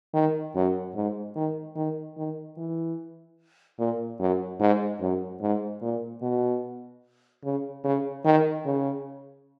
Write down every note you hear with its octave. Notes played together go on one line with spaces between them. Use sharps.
D#3
F#2
G#2
D#3
D#3
D#3
E3
A#2
F#2
G#2
F#2
G#2
A#2
B2
C#3
C#3
D#3
C#3